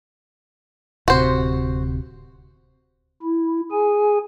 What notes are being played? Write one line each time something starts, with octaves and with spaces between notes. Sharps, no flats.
D1 C3 F#4 C5
E4
G#4 G#5